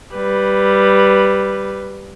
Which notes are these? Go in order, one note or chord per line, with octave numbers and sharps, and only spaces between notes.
G3 B4